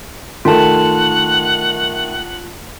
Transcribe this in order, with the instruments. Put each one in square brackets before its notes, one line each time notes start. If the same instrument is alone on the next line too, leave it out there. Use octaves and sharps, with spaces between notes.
[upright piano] D#3 A3 [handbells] F4 A5 [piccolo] F#5